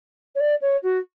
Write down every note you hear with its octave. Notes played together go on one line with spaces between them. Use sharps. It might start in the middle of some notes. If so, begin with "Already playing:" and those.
C#5
D5
C#5
F#4